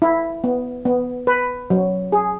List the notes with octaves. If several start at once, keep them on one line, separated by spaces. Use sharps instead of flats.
E4
B3
B3
B4
F#3
G#4